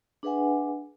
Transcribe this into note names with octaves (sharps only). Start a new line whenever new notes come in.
D4 G#4 B4 E5 F#5 G#5